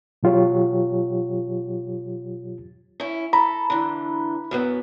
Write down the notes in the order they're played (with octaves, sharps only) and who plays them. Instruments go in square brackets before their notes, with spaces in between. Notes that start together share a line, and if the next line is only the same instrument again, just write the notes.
[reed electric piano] B2 F#3 F4 G4 C#5
[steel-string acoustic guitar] C#4 E4
[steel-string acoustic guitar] A4 [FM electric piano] A#5 B5
[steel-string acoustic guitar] D3 E3
F#2 F#3 B3